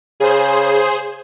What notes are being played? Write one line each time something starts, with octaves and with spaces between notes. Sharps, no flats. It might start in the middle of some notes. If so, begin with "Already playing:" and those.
C#3 G#4 C5